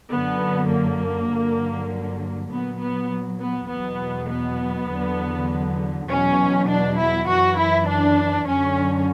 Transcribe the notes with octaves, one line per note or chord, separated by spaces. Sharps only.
F#2 D3 F#3 B3
A#3
G2 D3 F#3
A#2 F#3 B3
B3
B3
E2 B2 F#3 B3
B3
E2 D3 F#3
E2 B2 F#3 C#4
D4
E4
F#2 E3 F#4
E4
D4
F#2 D3 F#3 C#4